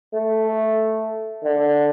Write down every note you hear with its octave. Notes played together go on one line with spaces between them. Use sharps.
A3
D3